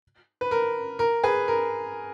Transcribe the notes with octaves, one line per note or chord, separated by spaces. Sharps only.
B4
A#4
A#4
G#4 B4
A#4